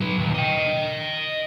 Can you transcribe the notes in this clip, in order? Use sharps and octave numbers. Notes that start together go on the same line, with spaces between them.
F#3 B4
D#2 A#2
D#5 G5